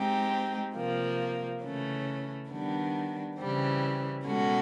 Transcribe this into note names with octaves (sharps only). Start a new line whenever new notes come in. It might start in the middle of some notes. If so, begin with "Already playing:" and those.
Already playing: G#3 C4 D#4 G4
C3 F3 A#3
C#3 E3 A3 C#4
D#3 G3 B3 D4
C#3 E3 G3 C4
B2 G#3 C#4 F#4 A4